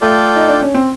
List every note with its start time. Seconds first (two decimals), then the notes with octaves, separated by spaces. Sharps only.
0.01 A3 F4 A4 D5 G5
0.36 D#4
0.48 D4
0.62 C#4
0.74 C4